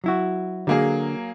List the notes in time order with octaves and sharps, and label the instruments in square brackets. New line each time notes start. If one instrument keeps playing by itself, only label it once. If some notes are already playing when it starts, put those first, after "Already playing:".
[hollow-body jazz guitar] F#3 E4 F#4
[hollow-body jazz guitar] D3 [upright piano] F#3 A#3 G#4